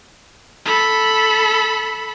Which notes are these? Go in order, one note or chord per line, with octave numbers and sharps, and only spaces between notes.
A4 B5